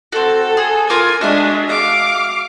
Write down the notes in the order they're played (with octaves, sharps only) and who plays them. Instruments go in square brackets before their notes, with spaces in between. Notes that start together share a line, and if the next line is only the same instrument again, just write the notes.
[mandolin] C4 F#4 [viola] A4
[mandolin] G#4
[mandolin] F4 A#4 D6 [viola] G#5
[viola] G#3 D4 [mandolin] F#4 E5 G#5
[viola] F5 D6